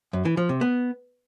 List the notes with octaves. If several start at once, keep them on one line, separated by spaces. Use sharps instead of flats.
F#2
E3
F3
C3
B3